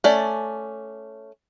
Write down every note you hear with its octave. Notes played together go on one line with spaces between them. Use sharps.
A3 C#4 D5